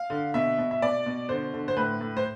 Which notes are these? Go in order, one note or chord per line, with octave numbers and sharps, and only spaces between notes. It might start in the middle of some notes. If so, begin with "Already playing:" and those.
Already playing: F5
D3
B2 E5
B2
E5
B2 D5
B2
D3 C5
D3
C5
A2 B4
A2
C5